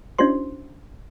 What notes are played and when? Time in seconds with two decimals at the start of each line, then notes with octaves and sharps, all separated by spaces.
0.19 C#4 D4 E4 F#4 C5 C6